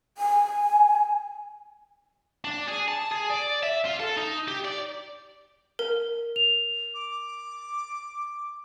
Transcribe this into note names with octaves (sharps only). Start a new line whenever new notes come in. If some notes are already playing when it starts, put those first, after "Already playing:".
G#5
D4
G#4
A5
G#4
D5
E5
F4
A4
D#4
G4
D5
A#4
F7
D6